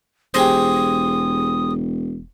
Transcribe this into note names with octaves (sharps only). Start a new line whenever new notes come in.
E1 G4 G#4 C5 D#6